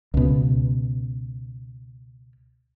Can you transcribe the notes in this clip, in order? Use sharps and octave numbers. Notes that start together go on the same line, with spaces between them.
C#2 B2